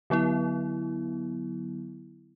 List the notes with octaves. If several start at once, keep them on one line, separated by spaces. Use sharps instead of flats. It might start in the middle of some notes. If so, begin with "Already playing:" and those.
D3 F#3 B3 E4